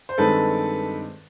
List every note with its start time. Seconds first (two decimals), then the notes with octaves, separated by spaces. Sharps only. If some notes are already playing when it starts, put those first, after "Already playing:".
0.09 C5
0.18 G2 D#3 G#3 C4 A4 B4